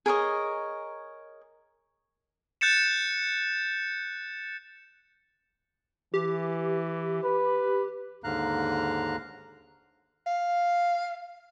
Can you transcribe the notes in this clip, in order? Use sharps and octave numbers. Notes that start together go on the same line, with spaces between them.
G#4 A#4 C#5 D#5
F#6 G6 A6 C#7 E7
E3 G4
B4
D#2 G#2 D3 F5 A#5 F#6
F5